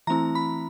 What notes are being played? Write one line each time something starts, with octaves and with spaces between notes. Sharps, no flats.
E3 A3 C4 E4 A#5
B5